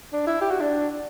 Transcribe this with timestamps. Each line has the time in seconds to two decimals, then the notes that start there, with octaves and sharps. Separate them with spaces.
0.13 D4
0.27 E4
0.41 G4
0.51 F#4
0.60 D4